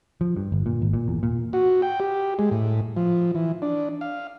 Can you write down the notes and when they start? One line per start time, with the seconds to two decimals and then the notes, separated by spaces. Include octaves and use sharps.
0.21 F3
0.37 G2
0.52 G1
0.66 A#2
0.82 G#1
0.93 A#2
1.08 E2
1.23 A#2
1.53 F#4
1.82 G5
2.00 G4
2.39 G#3
2.51 A2
2.97 F3
3.35 E3
3.62 D4
4.01 F5